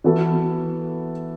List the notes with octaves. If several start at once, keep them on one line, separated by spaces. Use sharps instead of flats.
E3 B3 F#4 A4